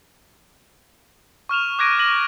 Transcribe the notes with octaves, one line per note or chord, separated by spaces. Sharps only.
C#6 F6 E7 F7
D6 F#6 G#6 A#6 D7 D#7
D6 A#6 F#7